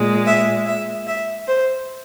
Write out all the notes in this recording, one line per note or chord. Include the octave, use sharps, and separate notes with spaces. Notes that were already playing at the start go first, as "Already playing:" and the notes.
Already playing: A#2 G#3
E5
E5
E5
C5